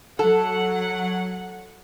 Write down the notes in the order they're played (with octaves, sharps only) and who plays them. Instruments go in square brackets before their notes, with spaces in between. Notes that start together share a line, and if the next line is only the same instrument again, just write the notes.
[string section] F#3 F#5 [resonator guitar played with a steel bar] A4